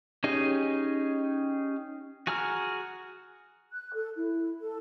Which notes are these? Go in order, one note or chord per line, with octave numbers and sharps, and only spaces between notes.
C#4 D#4 G4 G#4 D#5
F#4 G#4 G#5 A#5 F6
F#6
A4
E4
A4